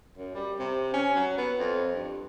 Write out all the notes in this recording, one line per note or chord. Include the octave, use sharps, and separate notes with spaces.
F#2
G3
C3
C#4
F#3
B3
F2
G2